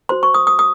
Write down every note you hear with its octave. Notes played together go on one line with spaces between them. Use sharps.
F#4 C5 C6
C#6
D#6
D#6
D#6